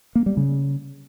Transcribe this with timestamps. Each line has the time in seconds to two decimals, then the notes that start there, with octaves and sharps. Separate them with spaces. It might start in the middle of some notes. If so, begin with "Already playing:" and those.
0.15 A#3
0.26 G3
0.37 C#3